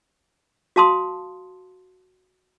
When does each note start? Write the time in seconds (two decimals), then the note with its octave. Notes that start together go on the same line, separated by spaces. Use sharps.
0.76 F#4 F5 A5 C6 D#6